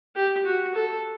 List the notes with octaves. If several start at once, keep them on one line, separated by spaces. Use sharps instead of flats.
G4
F#4
A4